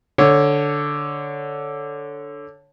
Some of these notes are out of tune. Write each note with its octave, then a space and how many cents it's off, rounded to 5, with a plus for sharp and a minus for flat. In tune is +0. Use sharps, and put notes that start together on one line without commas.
D3 +0 C#5 +0